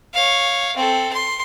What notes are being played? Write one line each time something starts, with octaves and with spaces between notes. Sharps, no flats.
C#5 F5
C4 A4
C6